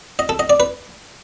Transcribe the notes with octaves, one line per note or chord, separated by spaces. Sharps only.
D#5
A4
D#5
D5
B4